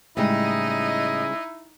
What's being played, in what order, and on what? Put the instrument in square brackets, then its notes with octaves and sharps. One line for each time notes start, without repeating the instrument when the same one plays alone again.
[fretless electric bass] A2 [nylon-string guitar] C#3 G3 G#3 [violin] D#4 D#5 [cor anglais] E4